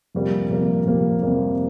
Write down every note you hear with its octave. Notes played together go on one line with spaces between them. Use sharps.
F2 C3 G3 A#3
F2 C3 G3 A#3
F2 C3 G3 A#3
F2 C3 G3 A#3